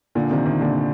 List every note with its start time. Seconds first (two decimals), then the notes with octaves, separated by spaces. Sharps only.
0.15 A#2 D3
0.31 C3 D#3
0.45 C3 D#3
0.61 A#2 D3